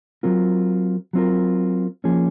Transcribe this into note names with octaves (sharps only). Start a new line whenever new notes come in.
F#3 C4 F4 A#4
F#3 C4 F4 A#4
F3 A#3 C#4 G#4